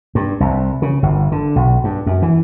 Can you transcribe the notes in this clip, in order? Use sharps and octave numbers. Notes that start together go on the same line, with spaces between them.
G2
C2
C#3
G1
D3
B1
G2
F#2
E3